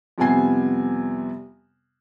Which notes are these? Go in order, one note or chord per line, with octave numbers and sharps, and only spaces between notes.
F2 C3 G3 B3 G#5 C7